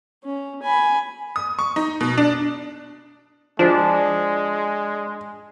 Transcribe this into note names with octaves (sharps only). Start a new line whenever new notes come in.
C#4
G#5 B5
D#6
C#6
D#4
B2
D4
F3 G#3 D4